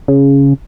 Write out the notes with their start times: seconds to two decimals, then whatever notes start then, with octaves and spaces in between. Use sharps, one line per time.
0.08 C#3